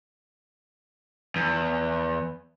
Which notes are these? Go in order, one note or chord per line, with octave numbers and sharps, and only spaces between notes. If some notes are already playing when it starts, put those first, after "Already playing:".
E2